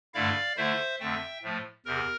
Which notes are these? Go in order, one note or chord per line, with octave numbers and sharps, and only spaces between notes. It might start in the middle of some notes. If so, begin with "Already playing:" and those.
G2 D3 A3 E4 D5 F5
D3 A3 E4 C5 E5
F2 D3 A3 E5 G5
A2 F3 A3
E2 C3 A#4